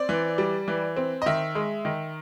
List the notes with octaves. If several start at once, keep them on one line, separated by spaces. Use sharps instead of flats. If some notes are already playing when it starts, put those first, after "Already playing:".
Already playing: C4 D5
E3
G3
E3
C4
D#5
D#3 E5
G#3
D#3